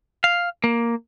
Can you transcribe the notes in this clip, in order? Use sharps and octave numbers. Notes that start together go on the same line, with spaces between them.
F5
A#3